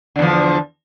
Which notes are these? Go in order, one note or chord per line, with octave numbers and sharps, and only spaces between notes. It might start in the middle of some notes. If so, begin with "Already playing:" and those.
E2 D3 F3